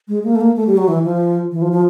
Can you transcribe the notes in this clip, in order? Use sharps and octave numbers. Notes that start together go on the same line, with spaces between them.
G#3
A#3
A3
A#3
A3
G3
F#3
E3
F3
E3
F3
F3